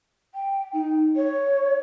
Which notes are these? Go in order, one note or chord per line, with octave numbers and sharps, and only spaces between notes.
G5
D#4
C#5